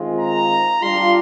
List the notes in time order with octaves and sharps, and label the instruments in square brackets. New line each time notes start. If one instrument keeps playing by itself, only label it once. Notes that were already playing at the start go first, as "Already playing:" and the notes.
Already playing: [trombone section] D#3 G#3 C4 F4
[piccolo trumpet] A#5
[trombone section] G3 D4 F4 [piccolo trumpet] C6